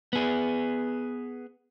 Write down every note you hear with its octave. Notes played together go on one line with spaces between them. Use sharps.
B3 G#4